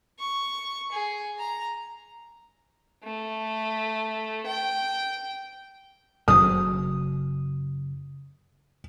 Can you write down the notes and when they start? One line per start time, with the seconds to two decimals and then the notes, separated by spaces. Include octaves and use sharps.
0.19 C#6
0.92 G#4
1.39 A#5
3.03 A3
4.46 G5
6.28 F#1 C#3 F#3 D#6